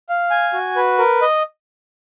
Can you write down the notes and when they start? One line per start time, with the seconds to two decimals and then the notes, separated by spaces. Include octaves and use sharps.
0.09 F5
0.30 G#5
0.53 F#4
0.76 B4
0.99 A#4
1.22 D#5